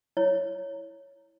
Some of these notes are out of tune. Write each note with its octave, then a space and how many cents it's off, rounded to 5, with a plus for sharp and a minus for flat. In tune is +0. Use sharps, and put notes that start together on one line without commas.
E4 +0 C#5 +0